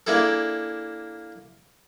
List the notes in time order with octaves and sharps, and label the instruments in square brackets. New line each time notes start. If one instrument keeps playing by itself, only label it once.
[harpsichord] A#3 D4 E4 G#4 A4